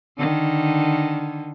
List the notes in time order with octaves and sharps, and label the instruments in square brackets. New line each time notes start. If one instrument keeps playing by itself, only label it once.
[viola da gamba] D3 D#3